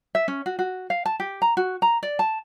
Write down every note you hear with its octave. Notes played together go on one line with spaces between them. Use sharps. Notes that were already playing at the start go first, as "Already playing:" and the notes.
E5
C#4
F#4
F#4
F5
A5
G4
A#5
F#4
A#5
D5
A5